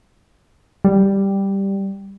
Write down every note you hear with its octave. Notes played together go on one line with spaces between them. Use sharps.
G3